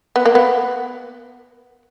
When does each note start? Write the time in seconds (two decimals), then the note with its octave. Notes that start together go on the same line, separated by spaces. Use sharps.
0.16 B3
0.25 A#3
0.35 B3